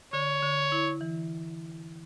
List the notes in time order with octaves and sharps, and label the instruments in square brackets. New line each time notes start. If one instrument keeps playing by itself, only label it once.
[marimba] D3 [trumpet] C#5
[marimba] D3
E4
E3